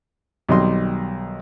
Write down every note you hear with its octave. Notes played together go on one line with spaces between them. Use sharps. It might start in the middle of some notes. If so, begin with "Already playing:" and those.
B1 D#3 G3 D#5 C6